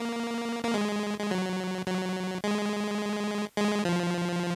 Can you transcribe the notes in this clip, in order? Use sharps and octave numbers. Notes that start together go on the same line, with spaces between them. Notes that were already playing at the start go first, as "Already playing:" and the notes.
Already playing: A#3
A#3
G#3
G#3
F#3
F#3
G#3
G#3
F3